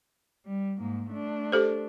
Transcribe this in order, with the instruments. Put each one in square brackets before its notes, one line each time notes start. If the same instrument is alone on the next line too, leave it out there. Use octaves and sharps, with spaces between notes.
[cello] G3
G#2 A#3
A3 D4
[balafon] G4 A4 C5